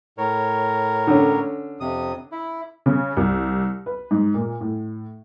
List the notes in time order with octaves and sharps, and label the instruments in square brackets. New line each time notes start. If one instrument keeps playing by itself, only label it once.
[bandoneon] A2 A#4 C#5
[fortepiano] D3 C#4
[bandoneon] F2 C3 D#6
E4
[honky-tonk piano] C#3
C2
B4
G#2
A#2
A2